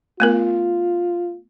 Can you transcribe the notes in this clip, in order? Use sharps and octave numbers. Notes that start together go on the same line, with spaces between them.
A3 B3 F4 A#4